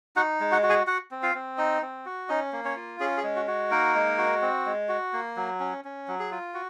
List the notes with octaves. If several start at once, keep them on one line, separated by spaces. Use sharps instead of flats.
D#4 F#4 F#5
G#3
F#4 F#5
F#4
G#4 G#5
F#4 F#5
C4
F4 F5
C4
D#4 D#5
C4
F#4
C#4 D#4 D#5
A#3
C#4 C#5
F4
C#4 G#4
G#4
G#3
F#4
F#4
A#3 D#4 A#4
G#3
F#4
C4
G#3
F#4
A#3
F#3
C#4
C#4
F#3
G#4
F4
F#4